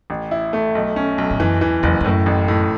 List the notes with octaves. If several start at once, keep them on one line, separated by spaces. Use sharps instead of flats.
A1
E4
A3
B1
C#4
B1
A2
F#2 E3
E2 E3
F#1 E2
E2
F#2 A2
A1
A2